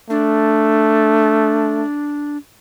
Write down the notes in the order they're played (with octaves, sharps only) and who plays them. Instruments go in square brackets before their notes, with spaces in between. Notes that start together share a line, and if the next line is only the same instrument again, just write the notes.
[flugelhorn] A3 [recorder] D4